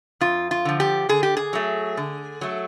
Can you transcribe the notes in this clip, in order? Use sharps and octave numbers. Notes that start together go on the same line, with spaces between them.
F2 F4
F4
D3 F3
G4
D3 G#4
G4
G#4
F#3 A3
D3
F#3 A3